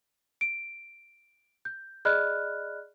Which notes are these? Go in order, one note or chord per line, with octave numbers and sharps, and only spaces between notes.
D7
G6
G#4 D5 D#5 B5 F6 F#6